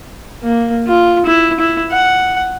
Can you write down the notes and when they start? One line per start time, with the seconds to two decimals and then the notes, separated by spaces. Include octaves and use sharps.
0.43 A#3
0.87 F4
1.25 E4
1.60 E4
1.91 F#5